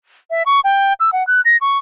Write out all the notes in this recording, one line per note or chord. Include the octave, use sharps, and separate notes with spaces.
E5
C#6
G5
E6
F#5
F#6
A#6
C#6